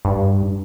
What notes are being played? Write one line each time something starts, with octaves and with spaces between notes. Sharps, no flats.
G2